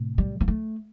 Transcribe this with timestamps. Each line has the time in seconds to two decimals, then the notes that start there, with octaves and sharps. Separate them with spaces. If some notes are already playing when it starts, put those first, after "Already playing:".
Already playing: A2 C3
0.18 G3
0.41 A#3
0.48 A3